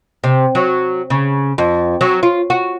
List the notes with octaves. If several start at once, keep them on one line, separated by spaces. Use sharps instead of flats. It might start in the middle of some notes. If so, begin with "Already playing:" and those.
C3
F#3
C#3
F2
F#3
F4
F#4